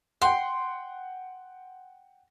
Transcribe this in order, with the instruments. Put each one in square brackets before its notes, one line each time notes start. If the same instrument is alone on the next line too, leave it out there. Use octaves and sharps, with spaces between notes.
[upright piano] F#5 G5 [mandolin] C6